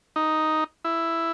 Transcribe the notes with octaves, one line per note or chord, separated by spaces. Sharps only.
D#4
E4